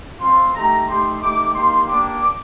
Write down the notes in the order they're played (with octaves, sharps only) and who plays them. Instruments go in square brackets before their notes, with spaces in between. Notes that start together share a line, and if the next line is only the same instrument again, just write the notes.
[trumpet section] C4 F4 C6
A3 D#4 G4 A#5
A3 D#4 G4 C6
A3 D#4 G4 D6
A#3 D#4 G4 C6
A#3 D4 G4 D6